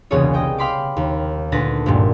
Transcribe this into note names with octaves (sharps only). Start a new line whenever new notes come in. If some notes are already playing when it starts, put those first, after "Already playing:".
E1 C2 C#3 B3 G#4 C#5
D#5 G5 G6
F5 G5 B5 C6 D6
D#2
D2 A#2 B4 A5 A#6
G#1 G2 A#2